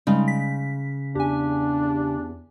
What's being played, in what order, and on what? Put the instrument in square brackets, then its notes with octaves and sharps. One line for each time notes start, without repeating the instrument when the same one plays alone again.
[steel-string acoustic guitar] C#3 [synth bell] G3 G#3 D#4
[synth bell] B6
[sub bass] E2 [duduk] D4 [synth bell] G4 G#5